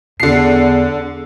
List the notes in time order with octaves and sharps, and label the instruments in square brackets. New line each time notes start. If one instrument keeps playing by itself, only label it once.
[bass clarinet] E2 [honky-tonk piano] D3 C7